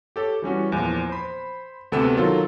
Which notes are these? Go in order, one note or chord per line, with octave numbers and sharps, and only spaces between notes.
G4 A4 C#5
E3 G3 C#4 F#4
E2 A#2 F3
C5 B5
D2 C3 B3 A4 E6 E7
D#3 F#3 F4 A4 A#4